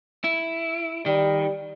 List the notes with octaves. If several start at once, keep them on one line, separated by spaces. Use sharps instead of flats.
E4
D#3 G3